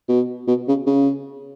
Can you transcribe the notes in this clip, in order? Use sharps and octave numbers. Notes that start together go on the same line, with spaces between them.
B2
B2
C#3
C#3